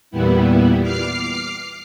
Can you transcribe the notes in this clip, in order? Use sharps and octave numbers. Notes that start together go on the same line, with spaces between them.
E2 A#2 G3 B3 E4
D6 F6 C7